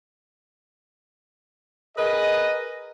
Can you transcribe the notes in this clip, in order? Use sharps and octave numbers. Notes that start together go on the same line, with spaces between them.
G#4 A#4 B4 D#5